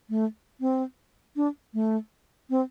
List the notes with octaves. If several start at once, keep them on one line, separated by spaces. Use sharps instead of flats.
A3
C4
D4
A3
C4